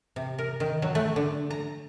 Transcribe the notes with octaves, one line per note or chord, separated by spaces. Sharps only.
C3
A#4
D#3
F#3
A3
D3
A#5